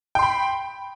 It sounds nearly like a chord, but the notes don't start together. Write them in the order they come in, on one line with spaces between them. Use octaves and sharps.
G5 C6 B5